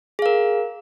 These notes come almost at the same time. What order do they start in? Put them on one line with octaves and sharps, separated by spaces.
G#4 F5 A#4